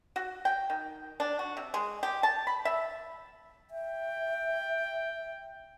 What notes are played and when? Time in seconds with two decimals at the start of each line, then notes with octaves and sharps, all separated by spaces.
0.16 F#4
0.45 G5
0.70 D#3
1.20 D4
1.39 F#4
1.57 C3
1.74 G#3
2.03 G4
2.23 A5
2.47 B5
2.65 E5
3.71 E5 G5